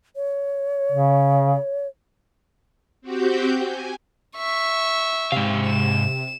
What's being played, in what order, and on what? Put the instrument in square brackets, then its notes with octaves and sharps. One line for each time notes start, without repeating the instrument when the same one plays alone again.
[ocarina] C#5
[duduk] C#3
[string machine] C4 F#4 G4 G6
G#5
[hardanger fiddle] E5 [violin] C#6
[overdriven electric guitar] G#2 F5 [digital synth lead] C3
[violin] E7